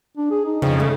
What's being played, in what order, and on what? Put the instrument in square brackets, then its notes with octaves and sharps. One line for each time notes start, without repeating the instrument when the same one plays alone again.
[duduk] D4
G#4
D#4
[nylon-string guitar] F2 [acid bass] C#3
[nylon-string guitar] A3